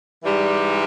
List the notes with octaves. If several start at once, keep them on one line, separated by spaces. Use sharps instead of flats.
G#2 E3 G3